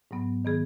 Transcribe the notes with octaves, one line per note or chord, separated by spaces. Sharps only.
G#2 F#3 B3
D#3 B3 G#4